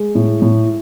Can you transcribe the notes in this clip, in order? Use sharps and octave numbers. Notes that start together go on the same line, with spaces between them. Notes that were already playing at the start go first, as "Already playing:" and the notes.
Already playing: G#3
A2
A2